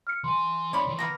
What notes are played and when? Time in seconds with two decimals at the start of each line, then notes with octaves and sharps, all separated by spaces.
0.07 F6 C#7
0.24 E3 G#5 C6
0.73 C4 D#4 C#5 D5 B5
0.87 D#3 E3
0.99 A#3 B3 A#4 A#6